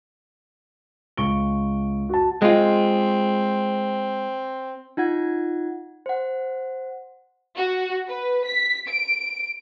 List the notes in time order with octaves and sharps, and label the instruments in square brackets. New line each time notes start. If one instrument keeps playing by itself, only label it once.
[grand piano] C#2 C#6 D7 G7
F#4 A5
[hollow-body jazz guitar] G#3 F4 [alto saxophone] C4
[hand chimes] D#4 F4 F#5 G#6
C5 F#5
[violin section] F#4
B4
B6
D7